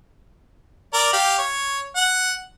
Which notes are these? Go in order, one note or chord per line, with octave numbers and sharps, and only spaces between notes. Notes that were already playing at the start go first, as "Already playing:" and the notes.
A#4 D5
G4 F5
C#5
F#5